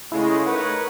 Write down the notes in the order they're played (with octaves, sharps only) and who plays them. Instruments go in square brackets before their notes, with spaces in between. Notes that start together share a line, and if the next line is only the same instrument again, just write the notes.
[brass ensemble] C#3 G#3 [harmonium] A3 [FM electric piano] E4
[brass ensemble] D#4 A#4 C#5 [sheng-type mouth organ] B4 F#5